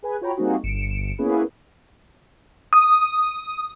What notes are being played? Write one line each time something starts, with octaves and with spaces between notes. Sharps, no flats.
G#4 B4 G#5
F4 F#4 C#5 G5 A#5 B5
G3 A#3 C4 D#4 F#4 G#4
G1 C#7 D7 E7
A#3 B3 C#4 E4 G#4 B4
D#6